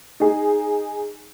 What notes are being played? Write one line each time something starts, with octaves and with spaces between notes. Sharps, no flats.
D#4 G#4